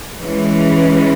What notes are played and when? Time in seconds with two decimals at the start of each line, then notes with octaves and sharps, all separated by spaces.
0.23 E3 G#3 C#4